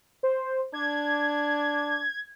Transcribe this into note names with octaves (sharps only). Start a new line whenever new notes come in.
C5
D4 G#6